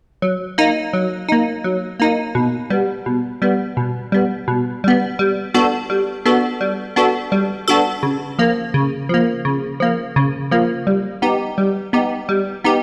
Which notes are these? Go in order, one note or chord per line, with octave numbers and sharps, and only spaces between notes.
F#3
A#3 D#4
F#3
A#3 D#4
F#3
A#3 D#4
B2
G3 B3
B2
G3 B3
B2
G3 B3
B2
G3 B3
G3
B3 D4 F#4 A4
G3
B3 D4 F#4 A4
G3
B3 D4 F#4 A4
G3
B3 D4 F#4 A4
C#3
F3 A#3
C#3
F3 A#3
C#3
F3 A#3
C#3
F3 A#3
G3
B3 D#4 G4
G3
B3 D#4 G4
G3
B3 D#4 G4